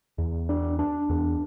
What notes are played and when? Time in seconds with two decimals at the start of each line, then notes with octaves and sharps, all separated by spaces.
0.18 E2
0.49 D4
0.79 D4
1.10 E2